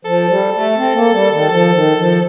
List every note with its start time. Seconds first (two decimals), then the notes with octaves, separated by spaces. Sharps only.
0.05 F3 A4
0.28 G3
0.53 A3
0.77 C4
0.95 A#3
1.12 G3
1.31 D#3
1.49 F3 A4
1.72 D#3
1.97 F3